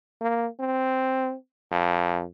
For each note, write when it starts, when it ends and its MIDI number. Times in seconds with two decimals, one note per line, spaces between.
0.21 0.47 58
0.60 1.35 60
1.72 2.24 41